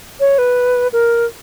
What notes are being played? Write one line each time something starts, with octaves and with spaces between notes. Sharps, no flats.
C#5
B4
A#4